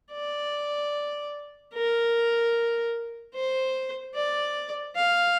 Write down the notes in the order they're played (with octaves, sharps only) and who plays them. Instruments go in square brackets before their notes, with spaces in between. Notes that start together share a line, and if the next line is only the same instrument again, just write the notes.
[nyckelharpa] D5
A#4
C5
D5
F5